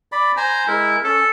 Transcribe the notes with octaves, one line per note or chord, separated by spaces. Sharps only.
D5 B5
C5 G#5 A#5
G#3 E4 A#4
C#4 A4